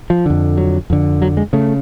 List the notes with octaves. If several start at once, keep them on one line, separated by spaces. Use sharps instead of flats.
F3
F2 D3
F#3
F2 D3
F#3
G#3
C#3 A3